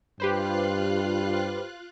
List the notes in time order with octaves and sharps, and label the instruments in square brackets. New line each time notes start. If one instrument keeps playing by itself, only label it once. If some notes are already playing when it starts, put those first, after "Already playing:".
[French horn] G2 [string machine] F4 F5 F#6 [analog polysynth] G4 B4 C5